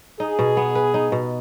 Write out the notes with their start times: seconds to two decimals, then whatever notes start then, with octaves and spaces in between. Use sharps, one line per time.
0.20 D#4 G#4
0.39 B2
0.57 B3
0.75 B4
0.94 D#4
1.12 B2